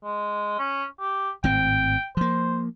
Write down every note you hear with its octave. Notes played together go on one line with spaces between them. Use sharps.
G#3
C#4
G4
G#1 A2 C4 G5
F3 A#3 C5